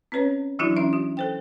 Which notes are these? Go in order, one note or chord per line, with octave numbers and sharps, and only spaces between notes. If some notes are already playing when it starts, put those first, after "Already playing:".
C4 C#4 B4 C#5
E3 F#3 D4 E4 F#4
C#4 D#4 E5
F#4
A4 C5 G5